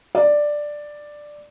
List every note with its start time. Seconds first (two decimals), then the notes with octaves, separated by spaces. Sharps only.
0.15 D5